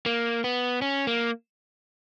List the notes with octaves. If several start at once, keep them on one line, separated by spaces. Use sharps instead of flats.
A#3
B3
C#4
A#3